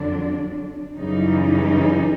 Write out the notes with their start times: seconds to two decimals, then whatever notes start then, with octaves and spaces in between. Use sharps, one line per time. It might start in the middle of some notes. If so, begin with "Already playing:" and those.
Already playing: F2 D3 F#3 D4
0.97 F#2 C#3 E3 G3 D#4